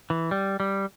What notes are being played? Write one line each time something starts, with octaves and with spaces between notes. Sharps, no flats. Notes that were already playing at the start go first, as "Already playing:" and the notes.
E3
G3
G3